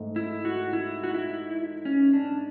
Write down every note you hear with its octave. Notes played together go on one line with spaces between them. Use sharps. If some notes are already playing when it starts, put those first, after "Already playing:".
Already playing: G#2 A3
E4
F#4
E4
F#4
E4
C#4
D4